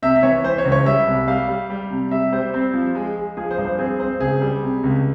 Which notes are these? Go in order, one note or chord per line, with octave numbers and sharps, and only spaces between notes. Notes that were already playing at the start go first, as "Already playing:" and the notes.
C3 E5
E5
E3 C#5
E3 C5
C#5
C#2
C#5
G3 E5
C2
G3 F5
G3
G3
C3
G3 E5
G3 C5
C4
F3
G#3
G#3
F3 G#4
C5
G2
C5
C4 G#4
C4 C5
C#2 G#4
G3
C3
C#2